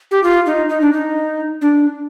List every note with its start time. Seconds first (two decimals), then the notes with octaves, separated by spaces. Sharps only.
0.11 G4
0.24 F4
0.46 D#4
0.69 D#4
0.81 D4
0.93 D#4
1.61 D4